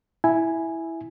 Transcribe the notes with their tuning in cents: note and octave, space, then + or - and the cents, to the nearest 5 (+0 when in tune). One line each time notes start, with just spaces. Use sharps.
E4 +0 G#5 +0